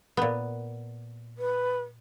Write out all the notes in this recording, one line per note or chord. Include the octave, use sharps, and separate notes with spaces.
A#2 B3
B4